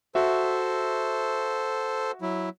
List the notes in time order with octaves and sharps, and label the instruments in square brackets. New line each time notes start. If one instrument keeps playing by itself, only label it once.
[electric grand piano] F#4 E5 [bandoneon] A4 C5
[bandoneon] F#3 E4